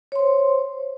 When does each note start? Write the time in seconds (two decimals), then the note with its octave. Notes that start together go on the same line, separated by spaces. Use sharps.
0.12 C#5
0.16 C6
0.19 C5